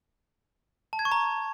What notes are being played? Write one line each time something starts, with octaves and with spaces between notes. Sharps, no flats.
A5
G#6
C#6
A#5